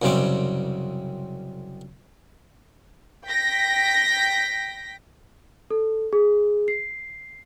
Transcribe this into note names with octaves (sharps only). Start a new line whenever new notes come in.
C2 F#2 C#3 G3 C4 D6
G5 A#6 B6
A4
G#4
C7